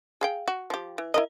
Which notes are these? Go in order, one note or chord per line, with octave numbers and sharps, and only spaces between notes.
G#4 F5 G5
F#4
F3 G4
E3
E4 A#4 D#5